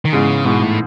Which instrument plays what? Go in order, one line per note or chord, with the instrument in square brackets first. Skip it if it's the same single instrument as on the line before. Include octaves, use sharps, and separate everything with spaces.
[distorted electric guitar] D#3
[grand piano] G#2 E3 G#3 B3 [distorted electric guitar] C#3
[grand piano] G#2 E3 G#3 B3 [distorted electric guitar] B2
[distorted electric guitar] A2